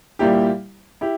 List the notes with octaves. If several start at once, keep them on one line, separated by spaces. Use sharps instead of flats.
A#2 G3 A#3 E4 G4
E4 G4